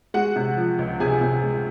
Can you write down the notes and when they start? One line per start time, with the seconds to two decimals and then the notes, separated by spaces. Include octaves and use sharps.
0.14 G#3 F#4 F#5
0.36 C3
0.57 F3
0.79 C#2
1.00 C3 G#4 G#5
1.21 C3
1.42 G#3